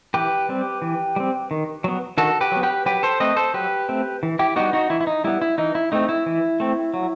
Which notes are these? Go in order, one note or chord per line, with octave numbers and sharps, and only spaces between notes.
E3 G4 B4
G3 C4
E3
G3 C4
D#3
F#3 B3
D#3 F#4 A4
G4 B4
F#3 B3
G4 B4
F#3 G4 B4
A4 C5
A3 C4 B4 D#5
A4 C5
F#3 G4 B4
A3 C4
E3
E4 G4
G3 B3 D#4 F#4
D#4 F#4
E3 E4
E4
D#4
G3 B3 E4
E4
E3 D#4
E4
A3 C4 D#4
E4
E3
A3 C4
F#3